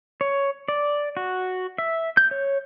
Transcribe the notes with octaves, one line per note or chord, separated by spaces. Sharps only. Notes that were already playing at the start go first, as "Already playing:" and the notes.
C#5
D5
F#4
E5
G6
C#5